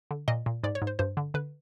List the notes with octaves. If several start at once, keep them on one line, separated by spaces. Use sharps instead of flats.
D3
A#2 D#5
A#2
G#2 D5
C#5
G#2
C5
G2 C5
D3
D3 B4